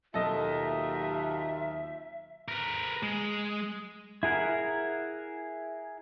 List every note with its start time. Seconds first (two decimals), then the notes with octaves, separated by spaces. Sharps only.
0.14 D#2 B2 F#3 C4 F4 A4 D#5 E5
2.48 A#4 B4
3.03 G#3
4.23 E4 G#4 A#4 F#5